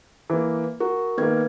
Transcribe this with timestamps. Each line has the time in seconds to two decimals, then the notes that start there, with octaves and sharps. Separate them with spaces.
0.30 E3 A#3
0.80 F#4 A#4
1.18 D#3 A#3 B3 B4 G#6